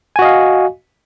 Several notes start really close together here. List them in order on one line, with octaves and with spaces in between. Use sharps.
G#5 F#4 D#5 F5